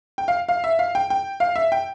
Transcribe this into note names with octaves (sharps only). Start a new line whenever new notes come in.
G5
F5
F5
E5
F5
G5
G5
F5
E5
G5